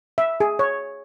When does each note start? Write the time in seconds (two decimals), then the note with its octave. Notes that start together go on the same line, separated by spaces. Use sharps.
0.18 E5
0.40 G#4
0.59 C#5